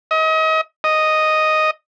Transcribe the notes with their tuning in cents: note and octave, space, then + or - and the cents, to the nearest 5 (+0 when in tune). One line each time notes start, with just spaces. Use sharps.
D#5 +35
D#5 +0